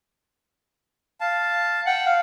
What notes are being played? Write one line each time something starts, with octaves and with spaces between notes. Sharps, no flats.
F5 A5
F#5 G5
F5